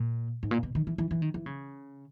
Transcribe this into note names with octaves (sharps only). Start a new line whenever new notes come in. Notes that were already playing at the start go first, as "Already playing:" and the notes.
Already playing: A#2
G#2
A#2
B2
D#3
E3
E3
E3
D#3
E3
C#3